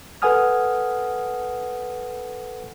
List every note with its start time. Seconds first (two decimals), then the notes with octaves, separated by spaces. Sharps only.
0.22 A4 B4 F#5 G#5 D#6 F6